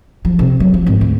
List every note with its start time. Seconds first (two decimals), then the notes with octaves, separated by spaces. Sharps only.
0.25 F3
0.39 C3
0.60 F#3
0.74 F3
0.86 G#1
1.01 D2